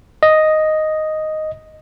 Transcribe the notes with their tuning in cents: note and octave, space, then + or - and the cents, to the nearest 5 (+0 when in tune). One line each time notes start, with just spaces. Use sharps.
D#5 +0